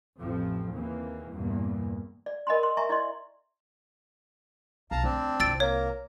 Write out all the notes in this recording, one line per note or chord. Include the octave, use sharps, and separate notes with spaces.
A1 F2 F3 C4
D#2 C#3 E3 A#3 C4
E2 G2 A#2 A#3
D5
A#4 D#5 G#5 B5 C6
C6
E5 G#5 A#5 C#6
E4 D5 D#5 C6
B1 F5 A5 A#5
D2 C4 D4
C2 F4 E6 A6 D7
A#3 C#5